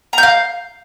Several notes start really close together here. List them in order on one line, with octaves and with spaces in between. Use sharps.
A#5 G6 F5